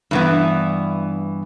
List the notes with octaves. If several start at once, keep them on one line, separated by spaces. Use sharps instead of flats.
G2 E3 B3